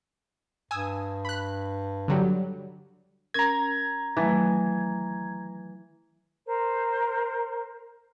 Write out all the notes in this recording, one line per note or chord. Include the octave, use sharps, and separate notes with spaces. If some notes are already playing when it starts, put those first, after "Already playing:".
G2 G#5 D#6 E6
B5 F#6
D3 F#3 G3
C#4 A#4 A#5 G#6
D#3 E3 F#3 A3
A#4 C5